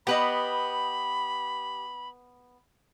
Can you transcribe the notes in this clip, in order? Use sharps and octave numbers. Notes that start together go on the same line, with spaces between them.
B3 G4 B4 D#5 B5